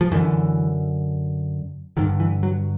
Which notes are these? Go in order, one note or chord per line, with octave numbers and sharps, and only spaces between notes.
F3
F#2 D3 E3
G2 D3 D#3
E3
F#3